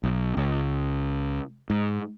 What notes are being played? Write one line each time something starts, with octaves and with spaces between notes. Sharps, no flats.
B1
C#2
G#2